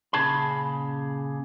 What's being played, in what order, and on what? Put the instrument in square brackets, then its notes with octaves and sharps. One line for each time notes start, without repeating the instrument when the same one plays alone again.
[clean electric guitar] A#2 C#3 G#4 A5 B5